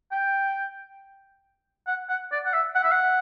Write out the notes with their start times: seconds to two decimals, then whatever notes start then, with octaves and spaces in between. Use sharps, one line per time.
0.12 G5
1.87 F#5
2.09 F#5
2.32 D5
2.46 F#5
2.53 E5
2.75 F#5
2.83 E5
2.91 F#5